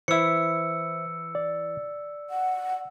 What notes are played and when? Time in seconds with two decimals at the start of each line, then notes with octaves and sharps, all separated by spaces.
0.08 E3 E4 C5 E5 E6 C#7
1.35 D5
2.30 F#5